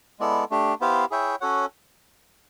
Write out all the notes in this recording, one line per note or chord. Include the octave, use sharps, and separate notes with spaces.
G#3 B3 E4 A4 D5
A3 D4 G4
B3 E4 G4 C5 F5
E4 G#4 C#5 E5 G5
C#4 F#4 A4 C#5 F#5